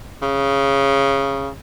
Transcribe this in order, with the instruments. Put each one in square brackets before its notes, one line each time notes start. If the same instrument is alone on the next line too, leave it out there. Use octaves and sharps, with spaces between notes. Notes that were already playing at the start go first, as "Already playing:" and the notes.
[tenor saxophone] C#3